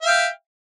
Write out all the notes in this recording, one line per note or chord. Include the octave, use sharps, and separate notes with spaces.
E5 F5 G5